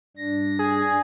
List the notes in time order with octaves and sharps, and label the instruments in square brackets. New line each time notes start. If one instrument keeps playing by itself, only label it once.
[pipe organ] G2 D4 A#6
[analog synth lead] G#4